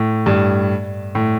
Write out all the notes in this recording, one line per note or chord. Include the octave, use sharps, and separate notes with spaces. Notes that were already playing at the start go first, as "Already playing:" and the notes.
Already playing: A2
G2
A2